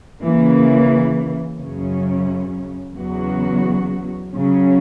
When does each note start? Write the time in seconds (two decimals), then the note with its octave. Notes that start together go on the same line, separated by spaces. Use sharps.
0.22 C#3 E3 A#3
1.59 F#2 C#3 F#3 C#4
2.95 E2 C#3 F#3 B3 F#4
4.32 C#3 F#3 C#4